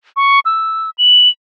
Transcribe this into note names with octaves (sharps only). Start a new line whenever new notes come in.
C#6
E6
F#7